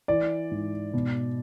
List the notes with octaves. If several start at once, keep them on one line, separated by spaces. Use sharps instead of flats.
E3 D5
G#2
B2